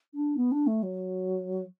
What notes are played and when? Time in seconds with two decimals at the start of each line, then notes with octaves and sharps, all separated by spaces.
0.14 D4
0.37 B3
0.52 D4
0.67 A3
0.83 F#3